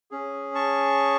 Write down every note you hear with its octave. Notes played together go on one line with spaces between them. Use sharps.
C#4 G#4
A5 C#6